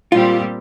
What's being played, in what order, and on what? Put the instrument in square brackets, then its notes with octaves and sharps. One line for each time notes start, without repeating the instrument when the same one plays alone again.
[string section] A#2 G3 C4 G4 [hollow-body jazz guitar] F4